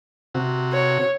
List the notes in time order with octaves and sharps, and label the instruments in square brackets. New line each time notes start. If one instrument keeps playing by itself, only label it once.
[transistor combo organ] C3 F#4
[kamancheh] C#5